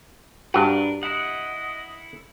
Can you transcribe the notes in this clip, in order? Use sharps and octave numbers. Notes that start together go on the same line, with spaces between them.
G2 D4 F#4 A#4 B4
E4 D#5 F#5